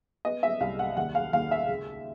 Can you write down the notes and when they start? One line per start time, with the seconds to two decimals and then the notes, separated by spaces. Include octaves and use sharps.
0.25 B3 D#5
0.43 E5
0.61 C2 F5
0.79 F#5
0.97 D#2 F#5
1.15 F5
1.33 D#2 F5
1.51 E5
1.69 C#2